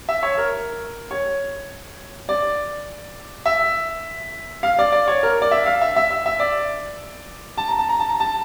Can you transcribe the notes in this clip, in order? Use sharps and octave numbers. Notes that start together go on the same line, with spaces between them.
E5
C#5
A#4
C#5
D5
E5
F5
D5
D5
C#5
A#4
D5
E5
F5
E5
E5
E5
E5
D5
A5
A#5
A5
A#5
A5
A#5
A5